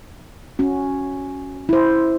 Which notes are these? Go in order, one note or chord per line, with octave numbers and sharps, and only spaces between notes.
C#4 F#4
E4 C5